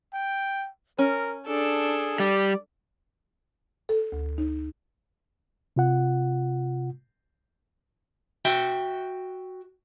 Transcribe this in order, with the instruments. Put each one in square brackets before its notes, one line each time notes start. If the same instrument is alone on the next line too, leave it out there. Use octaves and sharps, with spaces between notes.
[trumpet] G5
[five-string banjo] C#4 [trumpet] A#4
[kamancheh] D4 A4 [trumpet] G#4
[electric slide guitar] G3 [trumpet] D5
[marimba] A4
D2
D#4
[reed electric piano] C3 F4 F#5
[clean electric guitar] F#4 E5 G5